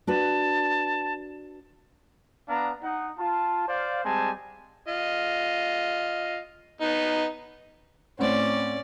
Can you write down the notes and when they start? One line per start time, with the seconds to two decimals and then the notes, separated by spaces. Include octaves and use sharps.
0.07 D4 F#4 B4 A5
2.49 B3 D4 F5 A#5
2.83 D#4 F#5
3.18 F4 A5
3.69 C5 D5 F5
4.05 G3 G#3 C4 G#5 A5
4.88 F4 D#5
6.81 B3 D#4
8.19 A2 C4 C#4 D5 F#5